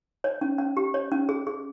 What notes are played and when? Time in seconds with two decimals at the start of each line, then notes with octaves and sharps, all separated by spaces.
0.24 C#5
0.41 C#4
0.58 C#4
0.77 G4
0.94 C#5
1.12 C#4
1.29 G#4
1.47 G#4